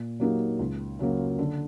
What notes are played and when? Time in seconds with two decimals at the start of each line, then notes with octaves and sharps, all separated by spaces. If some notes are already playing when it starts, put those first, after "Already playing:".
Already playing: A#2
0.20 F#3 A#3 D#4 G4
0.59 C#2
0.99 C#3 F#3 A#3
1.39 D3